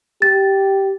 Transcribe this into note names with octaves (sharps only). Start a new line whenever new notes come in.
G4 A6